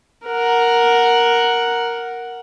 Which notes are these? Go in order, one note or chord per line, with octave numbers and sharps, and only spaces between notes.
A#4 F#5